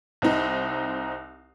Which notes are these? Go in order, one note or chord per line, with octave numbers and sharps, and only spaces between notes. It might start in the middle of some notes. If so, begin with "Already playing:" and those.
C2 C4 D#4